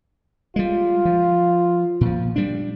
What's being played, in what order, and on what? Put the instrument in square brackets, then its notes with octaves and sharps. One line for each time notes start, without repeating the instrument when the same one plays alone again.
[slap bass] G3 G#3 [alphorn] F4
[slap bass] F3
A#2 F3
G3 D4